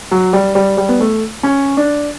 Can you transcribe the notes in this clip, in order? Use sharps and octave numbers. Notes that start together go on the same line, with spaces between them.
F#3
G3
G3
G3
B3
A3
C#4
D4